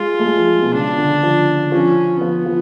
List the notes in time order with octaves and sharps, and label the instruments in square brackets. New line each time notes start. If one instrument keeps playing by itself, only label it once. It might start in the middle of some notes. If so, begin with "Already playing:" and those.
Already playing: [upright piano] G#3 [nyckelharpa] F4
[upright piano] A3
G#3
F3
B2
[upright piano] C#3 [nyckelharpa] D4
[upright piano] D3
F3
[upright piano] F3 [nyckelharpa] C#4
[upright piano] F3 [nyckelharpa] B3
[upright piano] F3